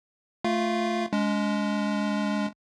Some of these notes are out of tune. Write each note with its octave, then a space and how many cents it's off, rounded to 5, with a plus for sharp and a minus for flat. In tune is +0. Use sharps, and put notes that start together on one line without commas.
A3 +0 F4 +0 F5 -10
G#3 +0 C#4 +45